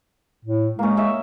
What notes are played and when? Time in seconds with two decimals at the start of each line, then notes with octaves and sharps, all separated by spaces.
0.45 A2
0.79 G#3 A#3 C#4
0.97 C#4 D#5 E5